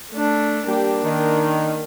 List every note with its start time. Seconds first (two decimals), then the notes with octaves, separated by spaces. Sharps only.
0.12 A3 D4
0.68 G3 A#3 D4 G4
1.04 D#3